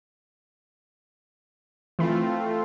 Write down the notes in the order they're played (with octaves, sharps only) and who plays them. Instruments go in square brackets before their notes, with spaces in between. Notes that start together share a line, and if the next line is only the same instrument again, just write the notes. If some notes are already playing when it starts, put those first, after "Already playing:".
[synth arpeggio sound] E3 B5 [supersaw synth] A3 C4 F4